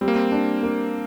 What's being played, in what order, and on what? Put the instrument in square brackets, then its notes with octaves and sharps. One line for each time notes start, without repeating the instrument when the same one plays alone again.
[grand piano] G3 [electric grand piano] C4
[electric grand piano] A#3
C4
[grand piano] D4
A#3